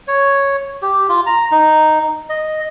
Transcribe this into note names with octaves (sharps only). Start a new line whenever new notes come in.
C#5
G4
F4
A#5
D#4
D#5